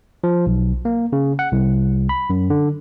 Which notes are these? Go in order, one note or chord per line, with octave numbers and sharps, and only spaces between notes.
F3
B1
A#3
C#3
F#5
C2
B5
F#2
D3